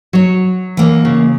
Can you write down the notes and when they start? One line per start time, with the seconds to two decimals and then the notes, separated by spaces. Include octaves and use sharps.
0.13 F#3 C#5
0.77 E3 A#3
1.05 C#3